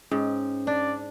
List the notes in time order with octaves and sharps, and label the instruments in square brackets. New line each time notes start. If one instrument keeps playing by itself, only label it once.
[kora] G#2 [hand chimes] C#4
[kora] D4 [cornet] D5